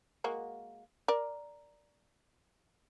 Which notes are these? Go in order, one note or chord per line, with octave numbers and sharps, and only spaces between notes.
G#3 A#3 F#4
A#4 D5